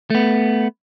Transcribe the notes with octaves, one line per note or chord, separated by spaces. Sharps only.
A3 B3